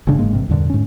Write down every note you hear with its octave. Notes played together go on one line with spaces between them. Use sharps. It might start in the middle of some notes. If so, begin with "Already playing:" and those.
F#1 G#2 C#3 D4
F#1 G#2 G#3 A#3
A1 G#2 C3
E2 G2 A#2 D3
G#2 C#4